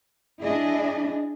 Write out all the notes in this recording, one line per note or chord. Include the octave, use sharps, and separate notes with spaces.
D4 E4 G#4 D#5